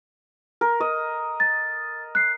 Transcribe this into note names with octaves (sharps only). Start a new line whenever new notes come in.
A#4
D#5
A6
F#6 C7